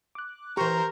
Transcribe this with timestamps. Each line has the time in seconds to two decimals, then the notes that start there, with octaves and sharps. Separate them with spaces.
0.15 D6 F#6
0.57 E3 G4 A#4 C5 A#5 C#6